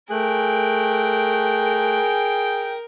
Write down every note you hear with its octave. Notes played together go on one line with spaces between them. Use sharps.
A3 G#4 A#4 G5 F#6